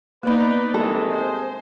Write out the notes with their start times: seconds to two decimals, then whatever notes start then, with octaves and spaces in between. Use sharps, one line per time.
0.23 A#3 B3 D#4 B4 D5 B5
0.74 G2 C3 D#3 E3 G#3 A4
1.09 C5